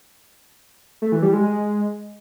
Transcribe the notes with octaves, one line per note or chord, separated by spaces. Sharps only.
A3
E3
G3
G#3
G#3